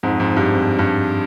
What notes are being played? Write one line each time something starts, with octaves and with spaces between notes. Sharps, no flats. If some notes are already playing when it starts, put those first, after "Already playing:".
F2 G#2
F2 G#2
G2
F2
G2